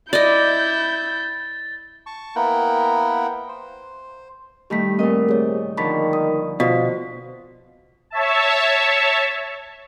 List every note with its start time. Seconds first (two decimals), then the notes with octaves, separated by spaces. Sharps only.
0.13 E4 D5 D#5 G6 A6
2.06 A5 C#6
2.36 A#3 B3 E4 A#4 F#5 G5
3.49 C5
4.70 D#3 G3 A3 G4 B6
4.99 A#2 C4 A#4 D#5
5.29 C3 G#4 C#5
5.77 D3 D#3 F3 A5 B5 C#6 B6
6.13 D#6
6.60 B2 F4 C5 B6
8.10 C#5 E5 A5